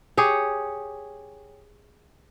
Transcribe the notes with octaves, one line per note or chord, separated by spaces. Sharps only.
G4 G#4 C#5